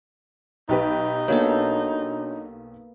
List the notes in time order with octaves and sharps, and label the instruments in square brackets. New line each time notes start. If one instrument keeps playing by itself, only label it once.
[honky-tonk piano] B1 G4 B4 [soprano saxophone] D#4
[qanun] A#3 B3 A4 [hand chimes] D4 F#4 C#5